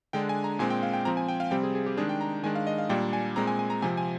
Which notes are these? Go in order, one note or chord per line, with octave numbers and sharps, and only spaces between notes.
D3 G#3 D4 G5
G#5
A#5
A#2 G#3 C4 G#5
G5
F5
G5
F3 C4 A#5
G#5
G5
F5
C3 G3 C4 G5
G#4
G#4
G4
D#3 G#3 D4 G#4
G5
A#5
D#3 G#3 D4 G#5
F5
D#5
F5
A#2 G3 A#3 D4 G5
G#5
A#2 G#3 C4 A#5
G#5
G#5
A#5
C3 F3 C4 G#5
G#5